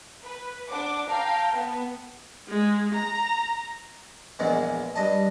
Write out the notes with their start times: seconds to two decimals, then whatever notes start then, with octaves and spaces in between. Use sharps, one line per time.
0.23 B4
0.69 D4 F#5 D6
1.09 F5 G5 A5 A#5
1.53 B3
2.48 G#3
2.94 A#5
4.39 A#1 E2 G#3
4.95 G2 D#5 A5